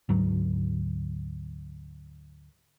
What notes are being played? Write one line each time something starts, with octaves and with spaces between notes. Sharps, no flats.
D2 G#2 F#3